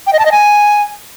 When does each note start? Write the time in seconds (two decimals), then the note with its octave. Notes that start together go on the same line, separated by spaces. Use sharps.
0.07 G5
0.13 D#5
0.19 A5
0.25 D#5
0.32 G#5